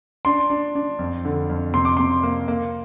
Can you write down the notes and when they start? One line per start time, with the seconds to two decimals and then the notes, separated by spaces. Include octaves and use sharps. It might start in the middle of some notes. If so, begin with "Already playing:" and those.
0.25 D4 C6
0.50 D4
0.75 D4
0.99 F2
1.25 D3
1.50 F2
1.74 C3 C6
1.85 D6
1.97 C3 C6
2.23 A#3
2.48 A#3